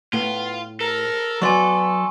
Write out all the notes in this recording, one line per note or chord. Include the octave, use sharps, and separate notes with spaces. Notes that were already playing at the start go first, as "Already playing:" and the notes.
A2 B3 F4
A4 A#4
F#3 B3 D5 G#5 C6 C#6